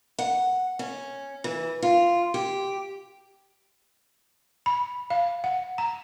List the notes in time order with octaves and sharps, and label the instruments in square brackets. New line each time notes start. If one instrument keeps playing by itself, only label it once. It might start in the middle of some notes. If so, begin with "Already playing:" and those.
[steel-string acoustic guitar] F#5
C#4
E3
F4
G4
[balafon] B5
F5
F#5
A#5